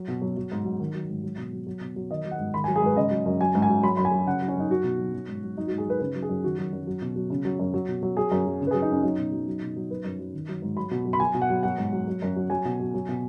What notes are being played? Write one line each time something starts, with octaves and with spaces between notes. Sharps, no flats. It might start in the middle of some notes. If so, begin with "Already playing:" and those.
Already playing: F#3
B2
F#3
F#3
G#2
F#3
D#3
F#3
G#2
F#3
B2
F#3
F#3
B2
F#3
D#3 D#5
F#3
F#5
G#2
D#3 B5
F#3 G#5
G#4
G#2 B4
C#3 D#5
F#3
F#2
F#3 G#5
G#2
G#5
F#3
F#3 B5
F#2 B5
G#5
F#3
C#3 F#5
F#3
C#4
F#2 D#4
F#3 F#4
B2
F#3
F#3
G#2
F#3
F#3 D#4
G#2 F#4
G#4
F#3 B4
C#3 B4
F#3
G#4
F#2
D#3 F#4
F#3
F#2
F#3
B2
F#3
C#3
F#3
F#2
F#3
B2
F#3
F#3 G#4
F#2
F#3
C#3
B4
F#3 G#4
D#4
F#2 C#4
F#3 D#4
B2
F#3
F#3
B2
F#3
F#3 B4
F#2
F#3
D#3
F#3
G#2
F#3 B5
B2
F#3
B5
F#3 G#5
B2
F#5
F#3
F#3 F#5
G#2
F#3
F#3
F#2
F#3
F#3 G#5
B2
F#3
F#3
B2